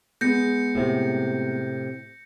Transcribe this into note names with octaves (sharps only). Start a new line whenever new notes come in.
G#3 B3 G6 A#6 C#7
A2 C3